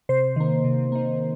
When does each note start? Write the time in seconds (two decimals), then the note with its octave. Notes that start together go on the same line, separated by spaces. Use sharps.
0.09 C3 C5
0.36 D#3 A#3
0.64 C3
0.92 D#3 A#3